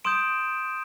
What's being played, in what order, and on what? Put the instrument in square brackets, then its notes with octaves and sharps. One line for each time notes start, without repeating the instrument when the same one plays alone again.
[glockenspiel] C6 D#6 G6 D7 E7